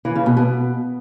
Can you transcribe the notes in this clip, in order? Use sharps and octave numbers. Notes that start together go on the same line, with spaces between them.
E3
C#3
B2
B2